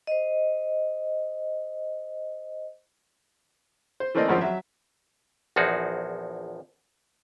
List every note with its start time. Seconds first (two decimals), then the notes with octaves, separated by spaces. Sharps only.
0.07 C5 D#5
4.00 C5
4.15 E3 A3 A#3 C4 D5 D#5
4.28 G#1 F#2 F3 C4
4.41 F#3 E5
5.56 A#1 E2 F3 D#4 F#4 G#4